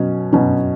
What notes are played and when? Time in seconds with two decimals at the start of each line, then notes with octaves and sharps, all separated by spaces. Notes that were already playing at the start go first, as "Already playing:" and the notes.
Already playing: B2 F#3 C#4
0.33 B2 F#3 C#4